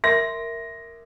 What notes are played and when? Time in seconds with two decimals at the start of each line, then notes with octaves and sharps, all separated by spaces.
0.04 A#4 E5 C6 A#6